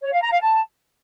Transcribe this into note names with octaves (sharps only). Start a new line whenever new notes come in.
C#5
F5
A#5
F5
A5